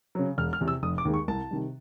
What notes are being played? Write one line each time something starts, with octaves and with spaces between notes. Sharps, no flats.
C#3 F#3
E1 F6
F6
E2 C3
E6
F1 D#6
D6
D#2 D#3 G#3
C#6
C2 A5
C3 D#3 G3